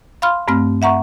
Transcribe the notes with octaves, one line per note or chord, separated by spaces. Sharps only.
F5 B5 C6 F6
G2 A3 C4 F6
E5 F#5 A#5 C#6